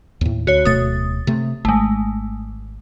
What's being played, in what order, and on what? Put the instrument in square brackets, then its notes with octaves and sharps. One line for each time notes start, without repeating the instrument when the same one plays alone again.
[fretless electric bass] D#2 A2
[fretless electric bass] D2 [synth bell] F#4 C#5
[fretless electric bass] D1 B2 A3 [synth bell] D#6 A6
[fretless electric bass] C3 A3
[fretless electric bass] G#1 [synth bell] G#3 A3